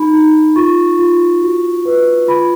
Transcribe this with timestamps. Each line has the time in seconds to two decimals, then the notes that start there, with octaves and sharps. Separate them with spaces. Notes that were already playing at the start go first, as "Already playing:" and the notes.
Already playing: D#4 B5
0.13 D#4
0.56 F4 C#6
0.99 F4
1.42 F#4
1.85 B4
2.28 F4 B5